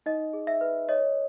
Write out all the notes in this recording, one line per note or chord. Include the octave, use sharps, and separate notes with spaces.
D#4 D#5
G#4
E5
B4
C#5 D#5